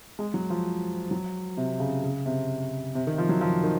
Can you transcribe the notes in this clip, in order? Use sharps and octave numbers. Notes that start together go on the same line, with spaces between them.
G#3
F#3
F3
F#3
C3
C#3
C#3
C3
C3
D#3
F3
F#3
F3
D#3